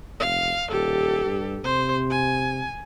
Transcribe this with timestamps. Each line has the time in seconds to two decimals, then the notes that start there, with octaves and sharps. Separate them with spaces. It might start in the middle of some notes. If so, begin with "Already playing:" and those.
0.20 F1 F5
0.70 D#1 G4 A4
1.25 G2
1.64 C3 C5
2.10 G#5